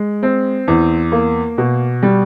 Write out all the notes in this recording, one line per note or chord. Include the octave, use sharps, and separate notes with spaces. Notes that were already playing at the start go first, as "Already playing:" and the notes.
Already playing: G#3
C4
E2
A#3
B2
G3